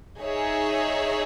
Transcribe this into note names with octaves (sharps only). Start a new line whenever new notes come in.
D#4 G#4 C#5 E5